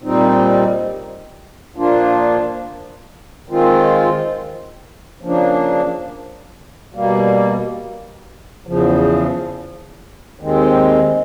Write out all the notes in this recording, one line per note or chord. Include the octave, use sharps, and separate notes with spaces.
A#2 G3 C4 D#4
A#2 F3 A#3 D4 F4
D#3 G#3 C4 F4
C#3 F3 A#3 D4
B2 G3 A#3
E2 C#3 F3
D#2 D#3 G#3 C4